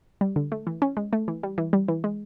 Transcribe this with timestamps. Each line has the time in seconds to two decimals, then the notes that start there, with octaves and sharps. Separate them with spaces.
0.21 G3
0.36 D3
0.52 A3
0.67 E3
0.82 C#4
0.97 G#3
1.13 A3
1.28 E3
1.43 G3
1.58 E3
1.73 G3
1.88 E3
2.04 G#3